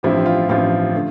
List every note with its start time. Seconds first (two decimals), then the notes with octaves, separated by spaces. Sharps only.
0.03 A1 G2 F3 C4 E4 G4
0.26 F4
0.49 A1 G2 F3 C4 F4
0.94 D3 A3